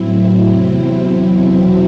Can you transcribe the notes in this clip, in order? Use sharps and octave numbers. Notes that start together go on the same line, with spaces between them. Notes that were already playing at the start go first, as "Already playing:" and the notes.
Already playing: A2 F#3 C4 E4
E2 C3 F#3 C4 E4
E2 B2 F#3 C4 E4